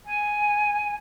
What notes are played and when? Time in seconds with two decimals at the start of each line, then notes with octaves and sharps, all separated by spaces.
0.06 G#5